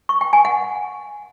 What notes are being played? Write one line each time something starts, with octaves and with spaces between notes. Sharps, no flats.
C#6
G5
G#5
F#5